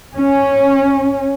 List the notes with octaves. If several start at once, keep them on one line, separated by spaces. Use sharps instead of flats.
C#4